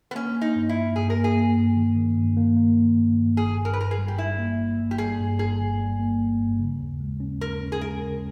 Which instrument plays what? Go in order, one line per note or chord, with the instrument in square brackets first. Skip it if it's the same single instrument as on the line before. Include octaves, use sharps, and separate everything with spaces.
[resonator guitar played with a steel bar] B3
[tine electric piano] A#3 [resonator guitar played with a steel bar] C#4
[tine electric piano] A#3
[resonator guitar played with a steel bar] D#4
[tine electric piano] G2
[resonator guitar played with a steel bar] E4
[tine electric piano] G2
[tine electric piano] G2 [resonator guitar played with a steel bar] G#4
[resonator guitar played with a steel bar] A#4
[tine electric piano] A#3
[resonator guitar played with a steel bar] G#4
[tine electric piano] A#3
G2
D#3
D#3
G2
A#3
A#3
D#3
G2
G2
[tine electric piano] G1 [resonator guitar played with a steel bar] G#4
[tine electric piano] G2
[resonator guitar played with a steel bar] A#4
B4
[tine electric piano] G2 [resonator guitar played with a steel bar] A#4
[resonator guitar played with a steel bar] G#4
[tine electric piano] G3
[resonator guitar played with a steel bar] G4
[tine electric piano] G3 [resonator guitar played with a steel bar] E4
[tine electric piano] A#3
G1
G3
[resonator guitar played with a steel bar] G4
[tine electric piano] G3 [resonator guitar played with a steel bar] G#4
[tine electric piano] G2
[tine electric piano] G1 [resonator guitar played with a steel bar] G#4
[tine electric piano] G1
G3
A#3
G1
G2
C#3
D#2
G#3
C#4
[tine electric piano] D#2 [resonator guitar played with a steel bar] A#4
[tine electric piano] C#4
[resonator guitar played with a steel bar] G#4
[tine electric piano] G#3 [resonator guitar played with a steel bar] A#4
[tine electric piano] C#3